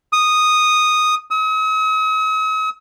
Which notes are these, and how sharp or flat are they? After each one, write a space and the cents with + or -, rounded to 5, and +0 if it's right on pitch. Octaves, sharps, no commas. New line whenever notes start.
D#6 -5
D#6 +45